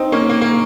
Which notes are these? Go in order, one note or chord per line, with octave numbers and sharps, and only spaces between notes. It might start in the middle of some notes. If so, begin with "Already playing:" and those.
Already playing: C4 D#4
A#3 C#4
A#3
A#3